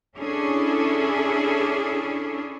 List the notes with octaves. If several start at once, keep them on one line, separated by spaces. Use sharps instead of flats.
C#4 D4 E4 G#4 A4